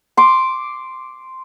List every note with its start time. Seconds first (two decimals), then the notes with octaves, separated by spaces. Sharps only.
0.17 C6 D6